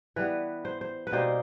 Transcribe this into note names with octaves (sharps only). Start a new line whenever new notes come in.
E3 G3 B3 B4
C5
C5
B4
B2 G3 A#3 D#4 C5